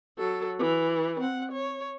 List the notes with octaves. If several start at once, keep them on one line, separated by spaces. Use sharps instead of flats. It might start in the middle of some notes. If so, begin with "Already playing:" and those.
F#3 A4
E3
C4 F#5
C#5